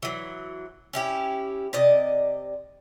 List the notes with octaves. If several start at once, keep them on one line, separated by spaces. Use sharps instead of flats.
E3 F#3
C#4 E4 G4
C3 D5 D#5